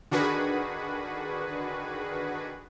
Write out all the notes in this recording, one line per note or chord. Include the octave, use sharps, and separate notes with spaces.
D3 D#3 D4 F#4 G#4 B4